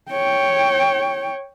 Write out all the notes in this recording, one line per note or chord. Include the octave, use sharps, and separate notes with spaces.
C#5 G5